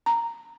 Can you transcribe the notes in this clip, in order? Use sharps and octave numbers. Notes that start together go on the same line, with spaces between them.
A#5